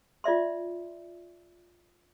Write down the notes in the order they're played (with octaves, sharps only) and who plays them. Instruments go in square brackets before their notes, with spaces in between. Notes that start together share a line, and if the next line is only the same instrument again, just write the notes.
[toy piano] F4 D5 E5 C6